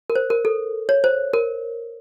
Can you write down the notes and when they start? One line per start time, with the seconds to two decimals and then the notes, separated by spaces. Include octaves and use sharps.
0.10 A#4
0.16 C5
0.30 A#4
0.45 A4
0.89 C#5
1.04 C5
1.33 A#4